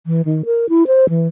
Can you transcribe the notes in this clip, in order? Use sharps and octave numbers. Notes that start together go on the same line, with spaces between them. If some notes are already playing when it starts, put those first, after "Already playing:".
E3
D#3
A#4
E4
C5
E3